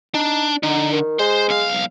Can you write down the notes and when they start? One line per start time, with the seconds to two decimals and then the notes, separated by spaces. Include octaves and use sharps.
0.14 D4 D#4
0.63 D3 D#4
0.92 D#3
1.19 G#3 C5
1.49 B1 F5